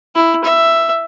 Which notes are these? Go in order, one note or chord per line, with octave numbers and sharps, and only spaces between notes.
E4
E5